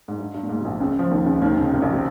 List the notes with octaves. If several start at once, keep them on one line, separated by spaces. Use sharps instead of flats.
G#2
G2
G2
A#2
G#2
C3
A#1 A#2
C#2 C#3
F3
D#2 D#3
C#2 C#3
D#2 D#3
C3
C#2 C#3
C2 C3
A#1 A#2
C3